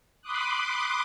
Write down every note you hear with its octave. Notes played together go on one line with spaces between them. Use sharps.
B5 C6 D6 D#6 F#6